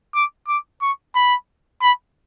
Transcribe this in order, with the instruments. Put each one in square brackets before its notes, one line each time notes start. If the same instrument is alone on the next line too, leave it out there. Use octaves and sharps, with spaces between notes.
[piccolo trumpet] D6
D6
C#6
B5
B5